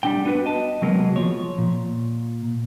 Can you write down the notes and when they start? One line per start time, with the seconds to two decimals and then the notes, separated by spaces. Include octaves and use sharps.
0.03 G3 D4 G5
0.25 B3 D4 F#4 G4 B4
0.46 D#5 A5
0.82 C3 F#3 G#3 A#3 B3
1.16 F3 C#5
1.58 A#2